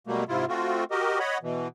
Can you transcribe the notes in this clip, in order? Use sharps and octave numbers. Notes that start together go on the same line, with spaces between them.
B2 F#3 G3 A3 A#3
G#2 C3 E4 F4
A3 C4 F4 F#4
F#4 G4 A#4 D#5
C#5 D#5 F#5 B5
B2 E3